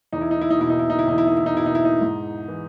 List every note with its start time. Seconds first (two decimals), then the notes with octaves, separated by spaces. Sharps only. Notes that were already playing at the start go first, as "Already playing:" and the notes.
0.12 E2 D#4
0.21 E4
0.31 D#4
0.41 E4
0.51 D#4
0.59 B2 E4
0.70 D#4
0.79 E4
0.90 D#4
0.99 E4
1.07 E2 D#4
1.18 E4
1.27 D#4
1.37 E4
1.46 D#4
1.54 B2 E4
1.66 D#4
1.75 E4
1.85 D#4
2.01 G#2
2.48 E3